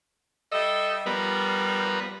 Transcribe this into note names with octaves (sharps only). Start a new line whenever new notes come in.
G3 A4 D#5 E5
F3 G3 B3 A#4 B4